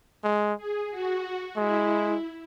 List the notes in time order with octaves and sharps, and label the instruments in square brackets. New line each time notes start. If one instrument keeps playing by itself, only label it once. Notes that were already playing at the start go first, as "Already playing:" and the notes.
[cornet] G#3
[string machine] G#4
F#4
[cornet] G#3 [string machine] E4